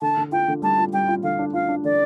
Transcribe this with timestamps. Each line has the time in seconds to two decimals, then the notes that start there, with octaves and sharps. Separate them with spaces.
0.02 D3 A5
0.17 D3
0.32 F4 G5
0.48 D3
0.62 G3 A5
0.79 F4
0.93 G3 G5
1.08 F4
1.23 D3 F5
1.39 D4
1.53 F4 F5
1.69 D4
1.84 D3 D5